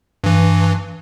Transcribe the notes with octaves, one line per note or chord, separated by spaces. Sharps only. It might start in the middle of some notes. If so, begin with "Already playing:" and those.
G2 E3